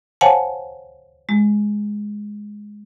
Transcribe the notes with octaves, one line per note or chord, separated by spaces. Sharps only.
C5 C#5 F5 F#5 G#5 A5
G#3